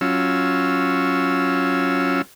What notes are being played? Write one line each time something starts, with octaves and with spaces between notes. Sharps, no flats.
F#3 C#4 F4 E6